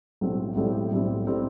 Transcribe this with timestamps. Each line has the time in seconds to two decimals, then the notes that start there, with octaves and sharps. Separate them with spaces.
0.21 B1 A2 G3 C4
0.56 B1 A2 G3 C4
0.92 B1 A2 G3 C4
1.27 A2 G3 C4